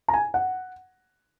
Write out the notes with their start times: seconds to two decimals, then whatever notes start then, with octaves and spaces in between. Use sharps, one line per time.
0.08 A#5
0.14 G#5
0.34 F#5